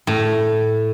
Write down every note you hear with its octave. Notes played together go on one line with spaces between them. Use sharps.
A2